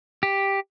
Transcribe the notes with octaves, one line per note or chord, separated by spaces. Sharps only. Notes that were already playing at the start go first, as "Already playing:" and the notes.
G4